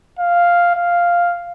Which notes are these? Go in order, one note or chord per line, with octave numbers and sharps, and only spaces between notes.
F5
F5